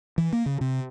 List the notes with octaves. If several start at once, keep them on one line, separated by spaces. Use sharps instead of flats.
E3
A#3
C#3
C3